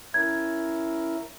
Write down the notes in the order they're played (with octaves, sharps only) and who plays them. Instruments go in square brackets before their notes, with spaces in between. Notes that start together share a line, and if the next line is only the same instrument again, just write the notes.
[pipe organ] C#4 E4 A#4 [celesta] G#6